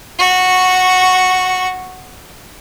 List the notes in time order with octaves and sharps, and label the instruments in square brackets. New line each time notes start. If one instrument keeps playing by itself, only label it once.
[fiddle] F#4 C#6